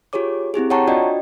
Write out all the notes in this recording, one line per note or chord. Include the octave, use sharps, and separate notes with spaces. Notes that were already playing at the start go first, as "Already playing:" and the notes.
F4 G4 G#4 C#5 D6
C4 E4 G4 G#4
C#5 F#5 G5 A5 A#5 C#6
D4 F4 F#4 D5 D#5 G5